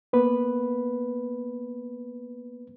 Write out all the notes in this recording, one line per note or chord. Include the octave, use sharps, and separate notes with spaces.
A#3 B3 B4